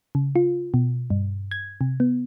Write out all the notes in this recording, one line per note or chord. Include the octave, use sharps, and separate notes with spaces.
C#3
F4
B2
G2
G#6
C3
B3